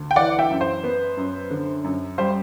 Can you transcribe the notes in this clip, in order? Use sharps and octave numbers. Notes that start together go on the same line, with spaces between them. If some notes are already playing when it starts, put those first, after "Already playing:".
Already playing: D2
G5
E3 D5 F#5
E5 G5
F#2
C5
B3
F#2
D3
F#2
G3 C5